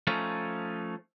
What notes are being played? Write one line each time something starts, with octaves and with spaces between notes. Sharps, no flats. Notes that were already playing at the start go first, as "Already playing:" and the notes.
F3 A3 C#4 D#4